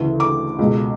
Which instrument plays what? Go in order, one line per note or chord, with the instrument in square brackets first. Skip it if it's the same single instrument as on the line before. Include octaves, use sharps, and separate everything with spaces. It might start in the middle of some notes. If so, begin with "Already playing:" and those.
Already playing: [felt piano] D2 C#3 E3
D6
C#2 B2